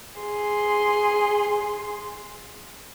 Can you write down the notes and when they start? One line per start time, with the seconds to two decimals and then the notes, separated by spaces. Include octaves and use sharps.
0.21 G#4 C6